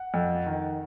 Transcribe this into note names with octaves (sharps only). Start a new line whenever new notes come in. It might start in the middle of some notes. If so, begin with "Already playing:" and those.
Already playing: F#5
F2
D#3